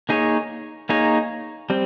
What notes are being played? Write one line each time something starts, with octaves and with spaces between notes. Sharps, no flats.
A#3 D#4 G#4 C#5
A#3 D#4 G#4 C#5
G3 C4